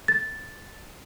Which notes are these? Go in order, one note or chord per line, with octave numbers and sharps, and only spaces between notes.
A6